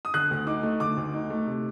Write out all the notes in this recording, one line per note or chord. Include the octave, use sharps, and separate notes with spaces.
D#6
D3 F#6
D2
D#4 D6
A3
D3 D6
D2
D#4
A3
C3